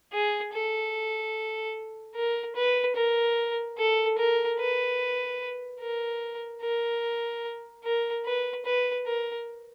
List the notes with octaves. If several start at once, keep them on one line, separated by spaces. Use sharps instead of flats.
G#4
A4
A#4
B4
A#4
A4
A#4
B4
A#4
A#4
A#4
B4
B4
A#4